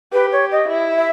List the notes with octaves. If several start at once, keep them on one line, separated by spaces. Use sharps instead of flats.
G4 B4
C#5
D#5
E4
E5